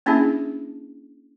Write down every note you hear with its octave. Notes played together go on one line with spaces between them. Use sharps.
A#3 C#4 D4 E4 G#4 E5